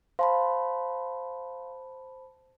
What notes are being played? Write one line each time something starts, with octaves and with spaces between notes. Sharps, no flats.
C5 F5 A5 B5 C6